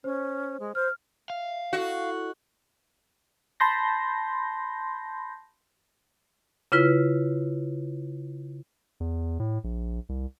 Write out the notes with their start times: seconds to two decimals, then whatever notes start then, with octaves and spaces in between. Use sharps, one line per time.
0.04 C#4 C5
0.60 G#3
0.75 C5 F6
1.30 E5 F5
1.73 E4 F#4 A4 D#5
3.60 A5 B5 C6 G6 A#6
6.72 C#3 E4 F4 B4
9.00 E2
9.40 A2
9.64 A#1
10.09 C2